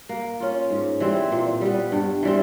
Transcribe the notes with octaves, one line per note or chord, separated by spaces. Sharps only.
A#3
C#4 F4
G#2
E3 G3 C4
A#2
G3 B3
G2
E3 G3 C4